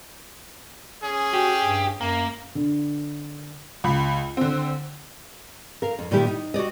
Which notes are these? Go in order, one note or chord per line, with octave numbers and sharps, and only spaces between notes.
C#4 G#4
F#4 G4
G2
F#2 A#3
D3
C#2 B5
D3 C4
A#4 F5
F2
A#2 D#3 G3 D#4 E4 G4
D#4
F#4 G4 D5 D#5